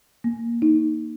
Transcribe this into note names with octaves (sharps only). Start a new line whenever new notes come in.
A#3
D#4